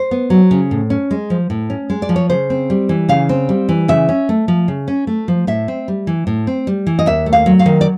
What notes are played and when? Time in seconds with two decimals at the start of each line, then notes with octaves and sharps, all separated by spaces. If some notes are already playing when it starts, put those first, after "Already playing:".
Already playing: C5
0.11 B3
0.30 F#3
0.51 C#3
0.71 A2
0.90 C#4
1.11 G#3
1.30 F3
1.50 A2
1.70 C#4
1.90 G#3
2.02 D5
2.09 F3
2.16 C#5
2.30 C#3 C5
2.50 C4
2.70 G3
2.89 E3
3.09 C#3 F5
3.29 C4
3.49 G3
3.69 E3
3.88 C#3 E5
4.09 C#4
4.29 A3
4.48 F3
4.68 C#3
4.88 C#4
5.07 A3
5.28 F3
5.47 A2 E5
5.68 C4
5.88 G3
6.07 E3
6.27 A2
6.47 C4
6.67 G3
6.87 E3
6.99 D#5
7.06 D#2 E5
7.26 A3
7.33 F5
7.46 F#3
7.59 F5
7.66 D#3
7.81 D5